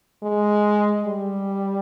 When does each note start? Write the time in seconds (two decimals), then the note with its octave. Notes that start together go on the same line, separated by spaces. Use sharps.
0.23 G#3
1.05 G3